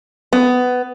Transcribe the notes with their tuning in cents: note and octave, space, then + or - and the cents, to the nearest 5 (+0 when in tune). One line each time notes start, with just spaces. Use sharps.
B3 +15